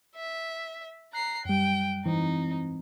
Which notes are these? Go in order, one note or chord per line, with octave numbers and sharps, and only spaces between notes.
E5
A#5 F#6 C7
F#2 G3 G5
G#2 E3 C4 D#4